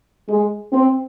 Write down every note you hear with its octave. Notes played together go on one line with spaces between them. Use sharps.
G#3
C4